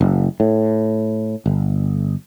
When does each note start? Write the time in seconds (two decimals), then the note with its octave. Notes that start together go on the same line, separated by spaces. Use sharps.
0.01 F#1
0.40 A2
1.46 G1